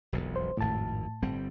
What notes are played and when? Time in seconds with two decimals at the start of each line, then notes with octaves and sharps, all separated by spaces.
0.12 E1 B1 F2
0.36 C5
0.57 G#1 F2 A2 A5
1.22 G1 G3 C4